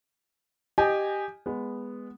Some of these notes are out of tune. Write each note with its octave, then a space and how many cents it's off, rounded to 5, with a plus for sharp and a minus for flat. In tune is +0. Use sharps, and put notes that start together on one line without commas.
G4 +0 D#5 -15 G#5 -10
G#3 -10 B3 +0